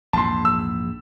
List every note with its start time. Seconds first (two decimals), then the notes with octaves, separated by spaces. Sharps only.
0.13 A#1 E2 G#2 A5 C6
0.45 E6